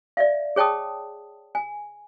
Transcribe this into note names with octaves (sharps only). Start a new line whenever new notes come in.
D5 E5 F5
G#4 C#5 G5 A5 D#6
G#5